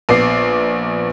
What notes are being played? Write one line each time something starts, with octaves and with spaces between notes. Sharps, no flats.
A#1 B3 D5 C7